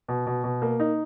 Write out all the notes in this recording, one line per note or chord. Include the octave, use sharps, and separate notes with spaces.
B2
B2
B2
A#3
D#4